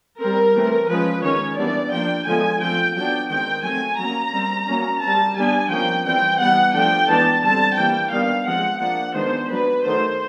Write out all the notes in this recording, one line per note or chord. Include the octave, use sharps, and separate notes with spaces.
G3 C4 A#4
E3 A3 C4
F3 G#3 C#4 B4
D#3 G#3 C#4 C#5
E3 G3 B3 D4 D5
F3 A#3 D4 G5
D3 F3 G#3 B3 G#5
F3 A3 C4 G5
F#3 B3 D4 G5
D#3 G#3 C4 G5
F#3 A3 C4 G#5
F#3 A#3 C#4 A#5
G3 C4
F#3 A#3 C#4
G3 C4 A5
G3 B3 D4 G#5
F3 A#3 C#4 G5
E3 G3 C4 G5
E3 G3 B3 F#5
F3 A3 D4 G5
E3 G#3 B3 D4 A5
D3 G3 C4 A5
E3 G3 A#3 G5
D#3 G3 B3 D4 F5
F3 G#3 C4 F#5
F3 A#3 D4 F#5
D#3 G#3 B3 D4 C5
F#3 B3 D4 B4
D#3 F#3 A3 C5